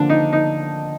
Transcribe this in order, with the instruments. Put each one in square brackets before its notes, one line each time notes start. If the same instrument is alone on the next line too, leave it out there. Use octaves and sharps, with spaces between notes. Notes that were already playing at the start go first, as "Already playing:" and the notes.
Already playing: [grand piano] D3 F3 A#3 [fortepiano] D4
[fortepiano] D#4
D#4